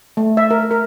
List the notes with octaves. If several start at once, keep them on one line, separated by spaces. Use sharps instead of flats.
A3
E5
A#4
A#4